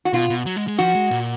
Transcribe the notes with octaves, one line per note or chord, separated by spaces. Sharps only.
F#4
B2 F4
B2
F#3
G#3
G#3
F3 F#4
G#3
A#2